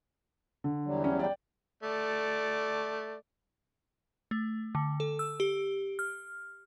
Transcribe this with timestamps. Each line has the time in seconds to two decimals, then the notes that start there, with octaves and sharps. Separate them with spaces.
0.64 D3
0.85 E2 F#3 G3
1.04 C#4
1.19 D5 G5
1.83 A3 D5
4.31 A3
4.75 D3
5.00 A4
5.19 E6
5.40 G4
5.99 F6